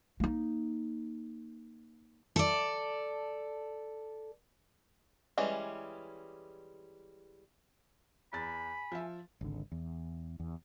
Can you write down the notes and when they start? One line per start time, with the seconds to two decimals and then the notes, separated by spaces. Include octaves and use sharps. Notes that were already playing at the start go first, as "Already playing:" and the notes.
0.20 A#3 D#4
2.36 A4 D5
5.38 E3 G3 G#3 C#4
8.33 E2 G#5 B5 A6
8.92 F3 E5
9.41 G#1 C#2 D3
9.72 E2
10.40 E2